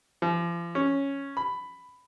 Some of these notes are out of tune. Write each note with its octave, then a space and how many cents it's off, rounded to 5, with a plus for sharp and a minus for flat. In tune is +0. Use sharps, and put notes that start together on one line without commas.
F3 -40
C#4 +0
B5 +10